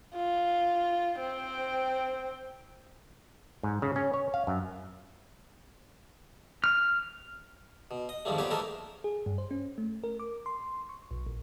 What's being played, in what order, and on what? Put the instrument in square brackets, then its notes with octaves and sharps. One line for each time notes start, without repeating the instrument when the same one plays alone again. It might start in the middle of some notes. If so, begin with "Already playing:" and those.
[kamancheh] F4
C4 G5
[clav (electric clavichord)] G#2
C#3
C#4
C#5
F5
F#2
[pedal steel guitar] F6
[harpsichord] B2
D#5
F2 G#2 D#3 F3 G3 A3
A#2 B3 C4 G4 C#5 D6
E3 G#3 A3 D#4 A4 A#4
[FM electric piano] G#4
G2
C5
C#4
A3
A#4
D6
C6
C#6
B1
A#1